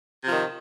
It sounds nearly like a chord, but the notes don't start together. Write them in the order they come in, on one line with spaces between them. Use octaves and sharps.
C3 F3 D#3